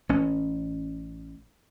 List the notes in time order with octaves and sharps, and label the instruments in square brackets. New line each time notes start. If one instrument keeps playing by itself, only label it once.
[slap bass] A1 C#4